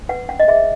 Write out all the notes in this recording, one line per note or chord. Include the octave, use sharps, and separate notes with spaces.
B4 F#5
C#4 F#5
D#5
G#4 E5